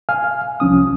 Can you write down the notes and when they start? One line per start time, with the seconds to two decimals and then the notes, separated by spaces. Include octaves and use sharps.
0.09 F5 G#5 F6
0.60 C2 F3 C#4 D#6